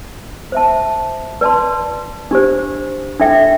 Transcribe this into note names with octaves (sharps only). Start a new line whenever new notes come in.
C5 E5 A5
B4 D5 A5 C6
D4 G4 C5
D4 A4 E5 G5